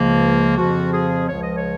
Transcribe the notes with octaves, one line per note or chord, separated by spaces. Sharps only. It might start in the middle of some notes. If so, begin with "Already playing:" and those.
Already playing: C#2 C#3 F3 A#3
F2 C#3 F3 F#4
G#4
C#2 C#3 F3 C#5
D#5
C#5